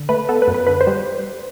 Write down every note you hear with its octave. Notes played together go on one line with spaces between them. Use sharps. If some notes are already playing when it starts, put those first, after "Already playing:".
Already playing: D3
A3 B4
B3 A4
B4
F#2
B4
D3 B4
C5
G3